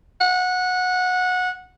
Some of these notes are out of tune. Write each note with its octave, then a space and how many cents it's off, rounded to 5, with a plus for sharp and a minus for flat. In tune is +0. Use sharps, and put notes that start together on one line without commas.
F#5 -20